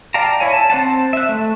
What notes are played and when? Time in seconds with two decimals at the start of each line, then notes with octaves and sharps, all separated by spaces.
0.14 D5 F5 G5 A5 A#5
0.40 E4 C#5 G#5
0.53 A5
0.70 C4 C5 F#5 A5
1.13 E5 F#6
1.29 A3